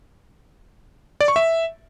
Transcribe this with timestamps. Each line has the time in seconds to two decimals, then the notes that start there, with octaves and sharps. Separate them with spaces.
1.21 D5
1.28 C#6
1.36 E5